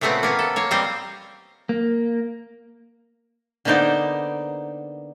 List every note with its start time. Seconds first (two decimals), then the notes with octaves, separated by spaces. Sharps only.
0.01 A#2 C#3 A3 B3 C4 F#5
0.23 A#3 B3 C#4
0.39 A4
0.56 A#3 C#5
0.71 G3 C4 D#5 F5 A#5
1.69 A#3
3.65 D3 A#3 B3 D#4 C5 D5